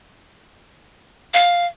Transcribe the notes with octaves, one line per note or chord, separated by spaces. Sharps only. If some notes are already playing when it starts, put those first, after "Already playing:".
F5